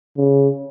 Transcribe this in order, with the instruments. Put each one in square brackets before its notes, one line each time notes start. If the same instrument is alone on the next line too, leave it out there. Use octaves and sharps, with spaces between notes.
[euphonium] C#3